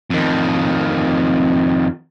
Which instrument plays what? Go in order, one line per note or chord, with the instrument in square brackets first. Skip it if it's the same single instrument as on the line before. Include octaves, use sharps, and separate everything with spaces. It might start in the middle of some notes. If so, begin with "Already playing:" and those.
[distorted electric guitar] F2 D#3